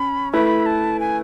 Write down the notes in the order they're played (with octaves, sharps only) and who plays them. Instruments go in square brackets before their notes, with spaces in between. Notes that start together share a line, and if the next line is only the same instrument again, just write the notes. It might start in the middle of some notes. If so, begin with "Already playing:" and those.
Already playing: [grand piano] C#4 [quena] B5
[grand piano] A3 E4 B4 [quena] B5
[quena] A5
G#5